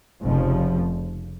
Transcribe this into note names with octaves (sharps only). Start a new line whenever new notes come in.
F1 F2 C#3 F3